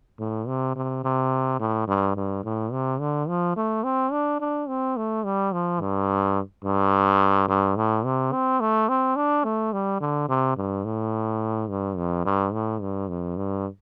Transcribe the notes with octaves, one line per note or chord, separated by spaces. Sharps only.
A2
C3
C3
C3
A2
G2
G2
A2
C3
D3
F3
A3
C4
D4
D4
C4
A3
G3
F3
G2
G2
G2
A2
C3
C4
A3
C4
D4
A3
G3
D3
C3
G2
A2
G2
F2
G2
A2
G2
F2
G2